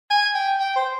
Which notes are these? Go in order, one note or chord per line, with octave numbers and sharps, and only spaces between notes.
G#5
G5
G5
C5